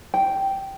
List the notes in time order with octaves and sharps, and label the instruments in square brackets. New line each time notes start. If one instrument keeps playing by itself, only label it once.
[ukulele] G5